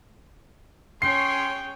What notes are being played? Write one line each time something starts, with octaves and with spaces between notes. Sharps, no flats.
C#4 G#4 C#5 G5 C6 C7